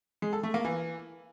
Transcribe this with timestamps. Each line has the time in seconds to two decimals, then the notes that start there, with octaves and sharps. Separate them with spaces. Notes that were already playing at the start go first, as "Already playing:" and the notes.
0.22 G#3
0.33 A4
0.43 A3
0.54 A#3
0.65 E3